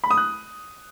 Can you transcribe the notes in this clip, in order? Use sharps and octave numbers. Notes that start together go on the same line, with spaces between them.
B5
D#6
F#6